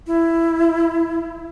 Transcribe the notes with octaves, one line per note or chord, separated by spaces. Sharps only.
E4